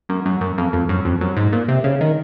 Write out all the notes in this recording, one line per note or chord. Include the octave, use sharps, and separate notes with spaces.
F#2
F#2
F#2
F2
F2
F#2
F2
F#2
G#2
A#2
C3
C#3
D#3